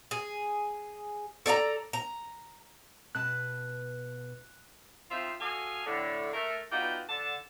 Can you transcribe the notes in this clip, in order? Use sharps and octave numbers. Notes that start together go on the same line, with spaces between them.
G#4
A4 D5 D#5 A#5
A#5
B2 B4 A5 F#6
F3 C4 D#4 F4 C5 E5
F#4 A4 D#5 F5 G#5
A2 D3
A3 A#4
B3 D#4 F4 F#4 D5 G5
D3 A5